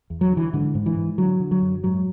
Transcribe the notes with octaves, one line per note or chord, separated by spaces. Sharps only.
E2
F#3
D3
E3
G#2 D3
G#2
E3
G#2
D3 F#3
D3
F#3
F#2
G#2 F#3